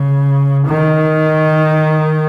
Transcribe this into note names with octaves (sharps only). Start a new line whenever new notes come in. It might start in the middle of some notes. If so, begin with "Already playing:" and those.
Already playing: C#3
D#3